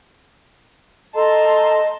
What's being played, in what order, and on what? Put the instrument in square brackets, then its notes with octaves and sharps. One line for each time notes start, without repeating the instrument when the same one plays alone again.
[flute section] A4 A#5 [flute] D#5 [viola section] A5 C6